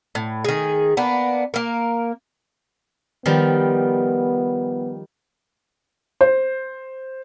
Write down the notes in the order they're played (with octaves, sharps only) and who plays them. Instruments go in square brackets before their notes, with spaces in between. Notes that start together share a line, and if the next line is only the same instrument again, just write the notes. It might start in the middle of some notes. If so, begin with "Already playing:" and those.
[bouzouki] A2
D#3 G#4
A#3 B3 D4
A#3 A#4
[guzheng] D#3 F3 G3 [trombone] B3
[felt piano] C5